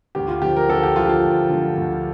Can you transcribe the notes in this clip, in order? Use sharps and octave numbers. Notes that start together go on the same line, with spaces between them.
D2 G4
F4
D3 F3 G4
A#4
D2 A4
G4
D3 F3 F4
G4
F4
D2
D3 F3
D2